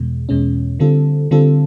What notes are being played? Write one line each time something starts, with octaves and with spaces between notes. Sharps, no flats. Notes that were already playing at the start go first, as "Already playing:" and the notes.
Already playing: E2 B2 G#3
E2 B2 G#3 C#4
D3 G3 C4 F4 A4
D3 G3 C4 F4 A4